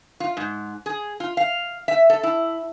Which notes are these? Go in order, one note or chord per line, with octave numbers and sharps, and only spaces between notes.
F4
G#2
G#4
F4
F5
E5
A4
E4